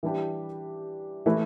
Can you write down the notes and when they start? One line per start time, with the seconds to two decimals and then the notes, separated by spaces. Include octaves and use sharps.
0.03 E3 G3 D4 G4
1.26 E3 A3 E4 B4